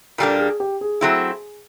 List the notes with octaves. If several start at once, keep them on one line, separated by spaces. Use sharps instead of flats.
A#2 G3 A#3 D4 A4
G#4
G4
G#4
F#3 A3 C4 E4